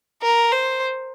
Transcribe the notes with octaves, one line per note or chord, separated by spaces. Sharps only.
A#4
C5